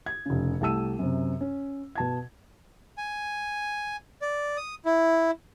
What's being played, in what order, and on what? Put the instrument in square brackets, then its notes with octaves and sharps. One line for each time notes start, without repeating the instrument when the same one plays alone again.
[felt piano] G#6
F1 C#3
C2 A3 G4 A5 E6 D#7
F#2 C3
C#4
B2 A5 G#6
[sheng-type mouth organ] G#5
D5
D#6
E4